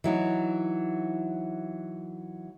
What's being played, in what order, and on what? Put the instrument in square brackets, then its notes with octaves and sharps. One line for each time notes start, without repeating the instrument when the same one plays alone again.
[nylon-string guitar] E3 F#3 D#4